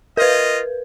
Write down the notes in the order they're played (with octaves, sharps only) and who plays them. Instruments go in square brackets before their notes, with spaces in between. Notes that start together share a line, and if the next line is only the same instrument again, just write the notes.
[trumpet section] F4 D#5 [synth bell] A#4 B4